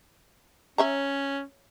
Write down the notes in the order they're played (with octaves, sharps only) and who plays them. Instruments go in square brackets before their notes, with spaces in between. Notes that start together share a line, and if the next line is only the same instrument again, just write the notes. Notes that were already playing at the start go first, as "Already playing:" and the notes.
[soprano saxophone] C#4 [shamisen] C#5 E5 A#5